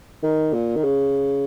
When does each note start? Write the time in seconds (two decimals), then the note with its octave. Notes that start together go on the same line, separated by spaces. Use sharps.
0.23 D#3
0.53 A#2
0.76 D#3
0.84 C#3